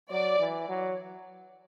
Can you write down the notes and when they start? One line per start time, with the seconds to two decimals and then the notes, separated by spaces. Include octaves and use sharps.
0.11 F#3 D5
0.39 E3
0.69 F#3